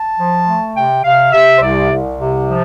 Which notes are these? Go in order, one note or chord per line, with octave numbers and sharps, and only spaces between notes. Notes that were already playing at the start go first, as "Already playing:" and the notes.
Already playing: A5
F3
A3
C3 G5
C3 F5
C3 E5
C5
C2 D5
C2
C3
F3